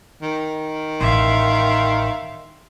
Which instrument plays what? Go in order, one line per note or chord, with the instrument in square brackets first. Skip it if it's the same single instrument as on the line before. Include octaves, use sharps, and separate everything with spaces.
[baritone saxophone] D#3
[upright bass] A1 [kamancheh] E5 F5 [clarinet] C6